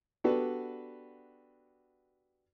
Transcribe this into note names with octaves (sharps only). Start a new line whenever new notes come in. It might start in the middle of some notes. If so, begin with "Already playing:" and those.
B3 D4 F#4 G4 A4 B4